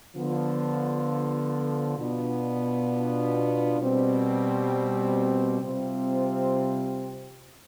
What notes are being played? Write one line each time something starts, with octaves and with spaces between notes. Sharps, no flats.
D3 F3 B3 F4
B2 B3 D4 F4
B2 G3 C4
C3 G3 C4 F4